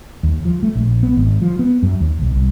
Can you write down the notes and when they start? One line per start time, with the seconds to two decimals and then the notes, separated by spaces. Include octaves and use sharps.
0.23 D#2
0.45 F3
0.63 A3
0.75 A#1
1.03 B3
1.17 G#1
1.42 F3
1.59 B3
1.83 F#2
2.00 D#2
2.22 B1
2.36 C2